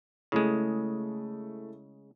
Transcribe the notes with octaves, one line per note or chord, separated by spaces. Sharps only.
C#3 G#3 A3 E4